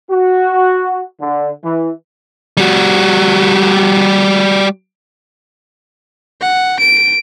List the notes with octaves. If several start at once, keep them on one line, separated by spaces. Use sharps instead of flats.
F#4
D3
E3
G3 F#4
F#5
D7